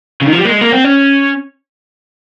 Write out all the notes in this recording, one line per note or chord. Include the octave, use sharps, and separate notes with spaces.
C#3
D#3
F3
G3
A#3
G#3
A#3
C4
C#4